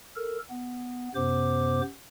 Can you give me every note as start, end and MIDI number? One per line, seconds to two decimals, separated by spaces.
0.16 0.39 69
0.16 0.39 70
0.50 1.09 59
1.15 1.81 42
1.15 1.81 48
1.15 1.81 59
1.15 1.81 72
1.15 1.81 86